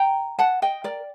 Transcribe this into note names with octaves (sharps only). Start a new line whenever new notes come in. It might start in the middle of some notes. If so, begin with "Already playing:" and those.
Already playing: G5 A#5
F#5 A5
D#5 G5
A#4 D5